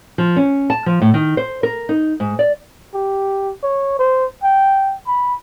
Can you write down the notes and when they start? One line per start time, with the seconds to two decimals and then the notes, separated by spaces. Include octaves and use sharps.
0.18 F3
0.36 C#4
0.70 A5
0.86 F3
1.02 A2
1.14 D#3
1.37 C5
1.63 A#4
1.89 D#4
2.20 G#2
2.39 D5
2.94 G4
3.63 C#5
3.99 C5
4.43 G5
5.07 B5